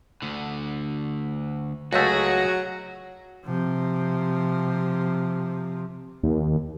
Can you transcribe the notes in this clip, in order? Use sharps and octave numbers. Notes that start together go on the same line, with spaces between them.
D2 D3
C#2 F#3 A3 F#4 G#4 A#6
C3 F3
D#2